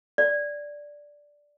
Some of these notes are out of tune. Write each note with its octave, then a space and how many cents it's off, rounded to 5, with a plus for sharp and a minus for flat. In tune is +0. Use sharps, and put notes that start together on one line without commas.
D5 -5